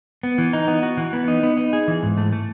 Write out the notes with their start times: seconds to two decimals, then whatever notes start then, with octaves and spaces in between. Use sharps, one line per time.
0.23 B3
0.38 E3
0.53 D#4
0.68 B3
0.83 F#4
0.97 E3
1.13 B3
1.28 D#4
1.43 B3
1.57 D#4
1.73 G#4
1.88 E3
2.03 G#2
2.17 A3
2.32 A3